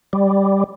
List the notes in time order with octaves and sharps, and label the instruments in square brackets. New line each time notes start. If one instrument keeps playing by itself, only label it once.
[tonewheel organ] G3